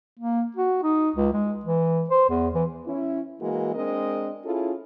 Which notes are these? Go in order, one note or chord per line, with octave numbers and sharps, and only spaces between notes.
A#3
F#4
D#4
C#2
G#3
E3
C5
E2
E3
C#4 E4
E3 G#3 A#3 F#4
G#3 C4 D4 A#4 D#5
C#4 E4 F4 G#4 A4